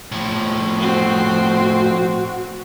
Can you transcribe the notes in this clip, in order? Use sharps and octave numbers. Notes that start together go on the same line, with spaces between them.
A2 F3
C4 F#4